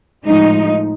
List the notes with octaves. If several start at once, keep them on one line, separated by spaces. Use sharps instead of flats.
A2 F3 G#3 D#4